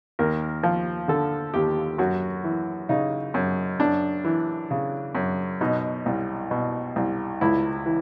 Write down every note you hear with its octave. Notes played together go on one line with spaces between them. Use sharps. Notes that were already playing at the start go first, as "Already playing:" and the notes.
D#2 A#4
F3
D3 A4
D#2 G4
F#2 F#4
E3
C#3 D#4
F#2
F#2 D4
E3
C#3
F#2
B2 D#4
C2
B2
C2
C#2 E4
E3